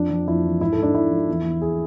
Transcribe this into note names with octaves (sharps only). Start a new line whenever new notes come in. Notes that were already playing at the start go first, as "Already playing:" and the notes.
Already playing: F2 D4
F2
F2 E4
E3
G#2 E4
G#2 A4
D4
G#2 E4
F3
E2
E2
G#4